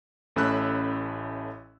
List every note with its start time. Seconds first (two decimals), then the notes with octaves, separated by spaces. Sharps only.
0.36 A1 A3 C#4 B5 E6 F#6